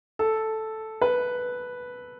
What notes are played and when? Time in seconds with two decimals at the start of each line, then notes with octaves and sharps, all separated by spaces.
0.19 A4
1.01 B4